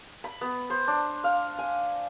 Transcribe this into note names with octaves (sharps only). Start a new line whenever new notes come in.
B5
B3
C5
D4
F5
G#5